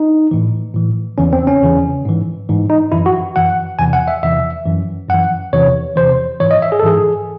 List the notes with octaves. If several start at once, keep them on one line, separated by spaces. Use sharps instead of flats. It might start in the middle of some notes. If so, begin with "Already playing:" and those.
Already playing: D#4
A2 E3
A2 E3
E2 C#3 E3 C#4
C4
C#4
E2 C#3 E3
G#2 E3
G#2 E3
D#4
F#2 E3 E4
F#4
F#2 E3 F#5
E2 C3 E3 G#5
F#5
E5
E2 C3 E3 E5
F#2 E3
F#2 E3 F#5
E2 C3 E3 C#5
E2 C3 E3 C5
G#2 E3 C#5
D#5
E5
G#4
A4
G#2 E3 G#4